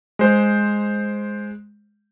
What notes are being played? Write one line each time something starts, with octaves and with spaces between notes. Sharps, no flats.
G#3 C5